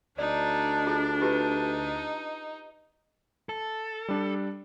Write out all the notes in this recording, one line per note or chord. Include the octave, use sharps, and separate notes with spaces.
D2 D4 D#4 D5
F4 G#4
D#4 F4 G4 B4
A4
G3 D4